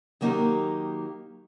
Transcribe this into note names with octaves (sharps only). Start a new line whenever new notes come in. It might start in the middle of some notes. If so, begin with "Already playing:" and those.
D#3 F#3 A#3 D#4 G4 A#4